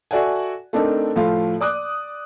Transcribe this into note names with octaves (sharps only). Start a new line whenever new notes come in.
F#4 A4 D5 E5 F#5 G#5
A3 C4 D4 D#4 A4 A#4
A2 F3 A3 F4 F5
D5 D6 D#6 F#6